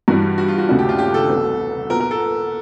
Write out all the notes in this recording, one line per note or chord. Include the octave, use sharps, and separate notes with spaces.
G2 E3 G3 F#4
F#4
F4
F#4
D#2 C#3 F#3 A3 D4 F#4
G4
F4
G4
A4
C2 B2 F#3 B3
A#2 F#3 B3 A#4
A#4
A4